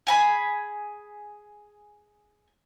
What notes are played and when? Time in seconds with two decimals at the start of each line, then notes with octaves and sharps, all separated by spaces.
0.07 G#4 G#5 B5